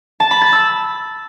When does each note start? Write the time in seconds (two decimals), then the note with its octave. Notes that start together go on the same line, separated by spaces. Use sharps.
0.20 A5
0.31 B5
0.42 A6
0.52 E6